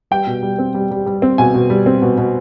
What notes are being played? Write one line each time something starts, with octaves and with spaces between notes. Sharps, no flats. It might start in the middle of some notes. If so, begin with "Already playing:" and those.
G3 G5
B2
G3
C4
G3
G3
G3
C4
B2 G#5
B2
G3
C4
B2
B2